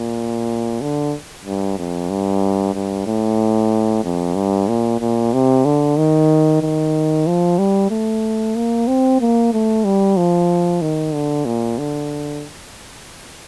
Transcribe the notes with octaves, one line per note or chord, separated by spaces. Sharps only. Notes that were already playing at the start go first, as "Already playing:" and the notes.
Already playing: A#2
D3
G2
F2
G2
G2
A2
F2
G2
A#2
A#2
C3
D3
D#3
D#3
F3
G3
A3
A#3
C4
A#3
A3
G3
F3
D#3
D3
A#2
D3